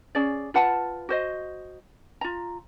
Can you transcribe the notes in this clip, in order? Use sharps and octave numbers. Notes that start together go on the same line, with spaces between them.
C#4 G#4 D5
F4 B4 F#5 A5
F#4 C5 D#5
F4 A#5